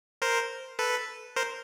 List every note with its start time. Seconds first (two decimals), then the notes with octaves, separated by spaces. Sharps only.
0.22 A#4 C5
0.79 A4 B4
1.36 A#4 C5